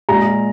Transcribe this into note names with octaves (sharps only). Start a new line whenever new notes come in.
A#2 G#3 A#5